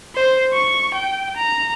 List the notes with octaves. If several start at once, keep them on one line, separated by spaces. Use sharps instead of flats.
C5
C#6
G5
A#5